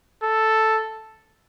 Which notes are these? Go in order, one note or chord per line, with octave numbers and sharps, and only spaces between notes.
A4